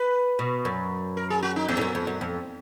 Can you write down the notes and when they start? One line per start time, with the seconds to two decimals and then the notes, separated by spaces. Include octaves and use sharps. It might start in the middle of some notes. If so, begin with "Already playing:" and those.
Already playing: B4
0.39 B2
0.65 F#2
1.17 A#4
1.30 G#4
1.42 F#4
1.56 D#4
1.68 F2 B3
1.77 G#2
1.81 F#2
1.95 F2
2.07 F#2
2.21 F2